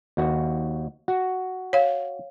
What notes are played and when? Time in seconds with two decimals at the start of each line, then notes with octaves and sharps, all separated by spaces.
0.17 D#2 F#4
1.08 F#4
1.73 C#5 F5